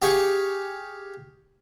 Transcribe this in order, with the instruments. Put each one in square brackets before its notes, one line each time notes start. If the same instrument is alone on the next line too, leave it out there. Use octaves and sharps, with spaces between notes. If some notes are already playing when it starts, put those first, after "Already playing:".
[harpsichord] G4 G#4 F5 C#6